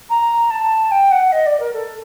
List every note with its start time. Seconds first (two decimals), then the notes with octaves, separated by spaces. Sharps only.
0.09 A#5
0.50 A5
0.91 G5
1.11 F#5
1.32 D#5
1.46 D5
1.59 A#4
1.73 A4